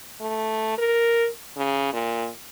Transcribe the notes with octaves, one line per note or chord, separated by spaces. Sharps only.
A3
A#4
C#3
A#2